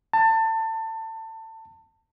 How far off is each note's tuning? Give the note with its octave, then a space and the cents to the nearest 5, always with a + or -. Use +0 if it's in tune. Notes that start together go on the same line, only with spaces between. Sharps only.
A5 +25